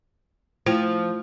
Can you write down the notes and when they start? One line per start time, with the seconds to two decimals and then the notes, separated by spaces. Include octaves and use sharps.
0.66 F3 A3 E4 C5